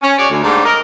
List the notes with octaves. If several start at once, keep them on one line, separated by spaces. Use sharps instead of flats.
C#4
F#4 G#4 C#5 D5
D2
G#2 G3 A3 A#3 D4
A#4 D#5